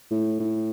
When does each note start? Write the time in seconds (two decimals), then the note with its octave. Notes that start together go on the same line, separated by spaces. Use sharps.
0.11 A2
0.39 A2